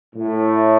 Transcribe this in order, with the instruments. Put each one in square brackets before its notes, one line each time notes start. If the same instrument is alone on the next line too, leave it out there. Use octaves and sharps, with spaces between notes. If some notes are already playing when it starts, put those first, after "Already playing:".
[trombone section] A2